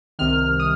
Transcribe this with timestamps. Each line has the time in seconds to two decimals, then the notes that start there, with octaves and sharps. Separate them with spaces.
0.19 C2 C3 D#3 F6
0.60 D#6